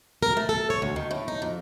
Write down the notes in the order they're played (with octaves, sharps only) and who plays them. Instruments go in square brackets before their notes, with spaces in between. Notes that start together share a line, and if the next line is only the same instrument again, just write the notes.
[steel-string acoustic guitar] A#4
A3
A4
C#5
D2
D#3
A2
D#4
F2